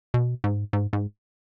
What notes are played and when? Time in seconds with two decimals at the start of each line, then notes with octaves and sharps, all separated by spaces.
0.14 B2
0.44 G#2
0.73 G#2
0.93 G#2